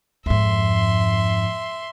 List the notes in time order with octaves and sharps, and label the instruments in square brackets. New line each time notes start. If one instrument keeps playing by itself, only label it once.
[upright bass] F2 G#2 [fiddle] E5 C6